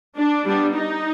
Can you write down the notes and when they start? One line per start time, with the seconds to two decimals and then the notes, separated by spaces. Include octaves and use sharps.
0.16 D4
0.45 G3 B3 D4
0.74 D#4